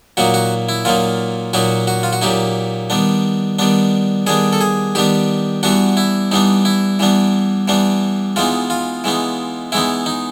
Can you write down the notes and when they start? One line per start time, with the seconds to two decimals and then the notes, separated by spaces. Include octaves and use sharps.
0.17 A#2 F#3 A#3 D#4 F#4
0.34 F#4
0.69 E4
0.85 A#2 F#3 A#3 D#4 F4
1.53 A#2 F#3 A#3 D#4 F#4
1.87 F#4
2.03 F4
2.13 F#4
2.21 A#2 F#3 A#3 D#4 G4
2.90 D#3 G3 B3 D4
3.59 D#3 G3 B3 D4
4.27 D#3 G3 B3 D4 G#4
4.53 A4
4.61 G#4
4.95 D#3 G3 B3 D4 G4
5.63 E3 G3 B3 D4 F#4
5.97 E4
6.32 E3 G3 B3 D4 D#4
6.65 E4
6.99 E3 G3 B3 D4
7.68 E3 G3 B3 D4
8.36 E3 G#3 B3 D#4 F4
8.70 F4
9.04 E3 G#3 B3 D#4
9.72 E3 G#3 B3 D#4 E4
10.06 D#4